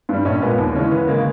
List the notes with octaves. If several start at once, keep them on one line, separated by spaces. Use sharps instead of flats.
G2 G3
A#1 C#4
A#2 G#3 B3
D#2
C#3 E3 G#3 C#4
E2 B3
C#3 G#3 A#3